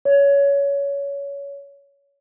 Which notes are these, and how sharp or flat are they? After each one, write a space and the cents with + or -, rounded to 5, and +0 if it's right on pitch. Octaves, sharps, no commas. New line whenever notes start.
C#5 +20